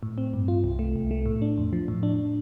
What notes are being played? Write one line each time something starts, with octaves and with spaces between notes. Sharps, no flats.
A2
C4
G2
F4
C2
A3
C2
A3
A2
D4
F2
F3
A2
D4